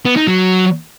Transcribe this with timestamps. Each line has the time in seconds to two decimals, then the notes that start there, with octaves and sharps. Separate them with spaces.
0.05 B3
0.16 D#4
0.27 F#3